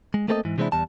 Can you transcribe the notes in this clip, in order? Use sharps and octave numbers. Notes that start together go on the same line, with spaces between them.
G#3
A3 A#3 C4 A4 B4 D#5
G#2 E3
C3 E3 G#3 C4 D4 E4
E2 G3 A5